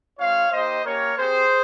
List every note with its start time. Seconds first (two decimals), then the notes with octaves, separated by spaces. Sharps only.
0.19 G#3 C4 F4 C#5 F5
0.52 A#3 D#4 G4 C5 D#5
0.85 A#3 C#4 G4 A#4 C#5
1.18 C4 G4 G#4 C5